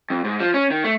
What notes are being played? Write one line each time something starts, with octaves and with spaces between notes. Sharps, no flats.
F2
G#2
F3
C#4
D#3
A3